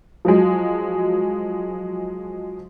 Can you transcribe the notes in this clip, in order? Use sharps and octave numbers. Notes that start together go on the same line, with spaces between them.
F3 F#3 G#3